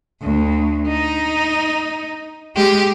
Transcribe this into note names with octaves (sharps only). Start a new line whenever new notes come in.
D2
D#4
G#3 G4